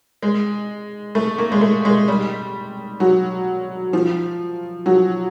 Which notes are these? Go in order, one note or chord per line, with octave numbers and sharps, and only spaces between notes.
G#3
A3
A#3
G#3
A3
G#3
G3
F#3
F3
F#3